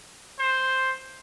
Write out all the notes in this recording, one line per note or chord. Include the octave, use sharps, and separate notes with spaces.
C5